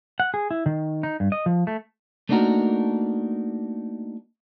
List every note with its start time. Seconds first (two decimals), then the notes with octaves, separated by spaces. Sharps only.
0.20 F#5
0.34 G#4
0.51 E4
0.66 D#3
1.03 D#4
1.20 G2
1.32 D#5
1.46 F3
1.67 A3
2.29 A3 A#3 D4 D#4 F#4 A#4